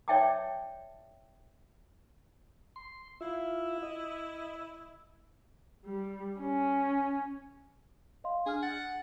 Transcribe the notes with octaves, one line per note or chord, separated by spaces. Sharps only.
C#5 D5 E5 G5 A5 D6
C6
E4 F4 E5
D#5
G3
C#4
D#5 F5 C6
D4 G#4 F6
F#5 A6